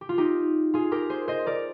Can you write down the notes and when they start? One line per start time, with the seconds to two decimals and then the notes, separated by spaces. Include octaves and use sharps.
0.01 G4
0.09 F4
0.18 D#4 G4
0.74 F4 G#4
0.92 G4 A#4
1.09 G#4 C5
1.28 C5 D#5
1.46 A#4 D5